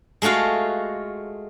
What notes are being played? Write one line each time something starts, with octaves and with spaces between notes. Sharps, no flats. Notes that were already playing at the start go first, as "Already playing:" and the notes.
G#3 A3 F4 F#4 F5